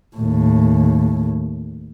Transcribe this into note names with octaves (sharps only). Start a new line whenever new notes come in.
D#2 A2